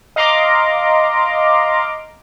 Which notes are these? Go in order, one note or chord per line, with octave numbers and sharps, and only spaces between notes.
D#5 F5 A#5 C6 D6